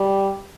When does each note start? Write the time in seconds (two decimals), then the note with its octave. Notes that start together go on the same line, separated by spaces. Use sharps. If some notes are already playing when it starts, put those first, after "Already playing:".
Already playing: G3